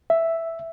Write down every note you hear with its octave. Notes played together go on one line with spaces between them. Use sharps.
E5